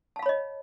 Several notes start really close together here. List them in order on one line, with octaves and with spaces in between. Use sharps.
A5 F5 B5 C#5 D#5